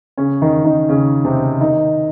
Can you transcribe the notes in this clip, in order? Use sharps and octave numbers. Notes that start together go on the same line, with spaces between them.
C#3 C#4
D#3 D#4
D#3 D#4
C#3 C#4
C3 C4
D#3 D#4